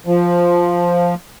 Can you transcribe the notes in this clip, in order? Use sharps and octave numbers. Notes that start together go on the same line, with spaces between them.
F3